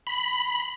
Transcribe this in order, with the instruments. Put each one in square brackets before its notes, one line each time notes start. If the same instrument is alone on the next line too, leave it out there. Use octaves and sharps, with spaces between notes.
[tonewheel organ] B5